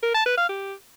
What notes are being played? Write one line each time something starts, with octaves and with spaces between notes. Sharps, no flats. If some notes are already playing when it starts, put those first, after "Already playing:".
A#4
A5
B4
F5
G4